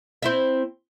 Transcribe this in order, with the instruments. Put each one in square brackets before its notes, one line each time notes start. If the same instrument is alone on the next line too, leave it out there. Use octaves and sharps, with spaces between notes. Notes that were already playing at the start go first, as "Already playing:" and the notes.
[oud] C4 E4 E5